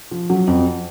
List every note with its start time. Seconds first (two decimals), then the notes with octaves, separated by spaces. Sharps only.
0.11 F3
0.30 F#3
0.47 F2